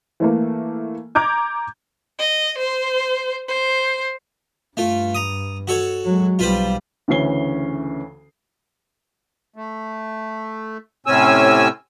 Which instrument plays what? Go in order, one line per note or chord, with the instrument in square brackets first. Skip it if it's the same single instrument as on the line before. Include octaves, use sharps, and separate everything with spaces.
[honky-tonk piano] E3 A3 A#3
A#5 D6 G6 G#6
[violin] D#5
C5
C5
[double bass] G2 [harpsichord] A3 F4
[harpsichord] A#5 D#6
F#4 A4 C#5
[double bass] F#3 G#3
[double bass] B1 G3 [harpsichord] F4 B4 C5
[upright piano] D2 C#3 E3 C#4 C7 G7
[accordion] A3
A2 C3 C4 C#4 G#5 E6